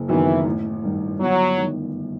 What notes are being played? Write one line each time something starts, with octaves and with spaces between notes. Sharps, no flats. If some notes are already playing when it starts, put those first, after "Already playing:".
Already playing: F#1
F#2 D#3 E3 F#3 B3
A1
G2 D#3
G1 F#3
G2 D#3